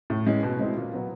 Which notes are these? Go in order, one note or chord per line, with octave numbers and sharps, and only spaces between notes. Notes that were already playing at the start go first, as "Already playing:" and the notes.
A2
E3 G#3 C#4
B2
G#3 C4 E4
A#2
F#3 B3